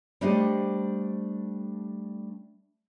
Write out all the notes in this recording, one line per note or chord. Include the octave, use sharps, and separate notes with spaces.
G3 A3 D4 G4 C5 D#5